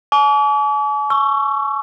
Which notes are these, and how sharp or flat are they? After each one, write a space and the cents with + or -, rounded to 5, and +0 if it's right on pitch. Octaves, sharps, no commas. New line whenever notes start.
G#5 +45 D6 -45
C#6 +0 E6 +30